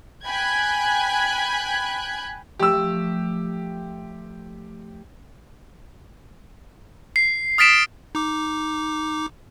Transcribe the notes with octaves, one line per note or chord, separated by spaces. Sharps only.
G5 G#5 B5 F#6 G#6
F3 A3 G4 E6
C7
D#6 F6 A6 B6 D7 E7
D#4 D6